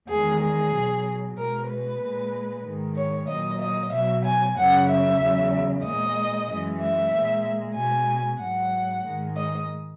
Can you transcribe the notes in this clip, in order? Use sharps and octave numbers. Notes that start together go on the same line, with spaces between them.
E2 D#3 G#3 G#4
G#4
B2 F#3
B2 G#3 A#4
B4
A#2 G#3
G#2 D#3 G#3
C#5
A#2 F#3 D#5
D#5
B2 F#3 E5
G#5
F#2 C#3 F#3 F#5
E5
E2 C#3 F#3
A#2 G#3 D#5
F#2 E3 G#3
E5
A#2 G#3
B2 G#3 G#5
G#2 F#3 F#5
G#2 D#3 G#3
D#5